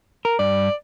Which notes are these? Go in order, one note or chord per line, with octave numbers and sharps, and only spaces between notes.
A#4
G2 D5